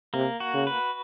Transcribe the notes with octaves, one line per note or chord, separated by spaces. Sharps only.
C3 A#3
F#4
C#3
B4